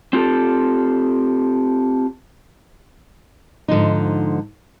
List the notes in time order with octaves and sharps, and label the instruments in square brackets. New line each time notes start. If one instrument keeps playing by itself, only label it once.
[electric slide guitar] C4 F4 G4 A4
[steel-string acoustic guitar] G#2 D3 F3 D#4